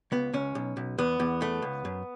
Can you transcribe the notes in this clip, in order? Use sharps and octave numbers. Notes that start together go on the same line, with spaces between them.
C#2 B3
C#2 C#4
B1
B1
E2 B3
E2
A3
C#2
F#2